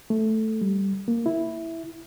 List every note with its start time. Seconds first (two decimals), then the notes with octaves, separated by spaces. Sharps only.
0.10 A3
0.61 G3
1.08 A#3
1.26 E4